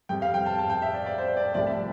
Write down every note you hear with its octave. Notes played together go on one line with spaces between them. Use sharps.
F2 C3 G3 G5
F5
G5
A5
A5
G5
E5
D5
D5
C5
D5
C2 C3 F3 A3 D5
E5